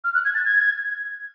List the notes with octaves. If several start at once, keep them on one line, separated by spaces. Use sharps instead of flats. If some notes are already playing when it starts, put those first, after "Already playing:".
F6
F#6
G#6
A6
G#6